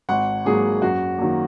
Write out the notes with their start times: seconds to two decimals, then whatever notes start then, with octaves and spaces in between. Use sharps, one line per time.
0.09 G#1 F#5
0.45 G#2 F#3 A#3 G#4
0.82 F#2 F#4
1.18 D#3 F#3 A#3